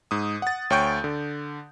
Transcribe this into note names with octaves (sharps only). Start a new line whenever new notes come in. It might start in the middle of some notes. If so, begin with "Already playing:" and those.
G#2 D#6
F#5 A6
D2 C#5 G5 C#6 G6 D7
D3